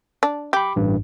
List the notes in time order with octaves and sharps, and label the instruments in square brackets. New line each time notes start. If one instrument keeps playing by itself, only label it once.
[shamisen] D4
[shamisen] G4 [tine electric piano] B5 D6
[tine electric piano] A1 G2